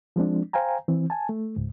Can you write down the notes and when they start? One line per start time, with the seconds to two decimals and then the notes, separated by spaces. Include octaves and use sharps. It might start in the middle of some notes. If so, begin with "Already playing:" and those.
0.16 F3 G#3 C4 D4
0.53 C5 F5 G5 G#5 A#5
0.88 E3 C4
1.10 G#5 A5
1.29 A3
1.56 C#2 G#2